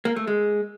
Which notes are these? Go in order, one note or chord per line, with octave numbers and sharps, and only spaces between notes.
A#3
A3
G#3